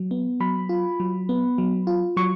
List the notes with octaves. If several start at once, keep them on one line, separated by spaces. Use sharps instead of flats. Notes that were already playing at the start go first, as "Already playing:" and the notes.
Already playing: F#3
B3
F#3 B5
F4
F#3
B3
F#3
F4
F#3 C#6